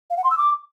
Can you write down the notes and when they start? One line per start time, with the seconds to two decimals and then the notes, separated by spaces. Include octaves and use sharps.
0.10 F5
0.17 F#5
0.24 C6
0.31 E6
0.38 D6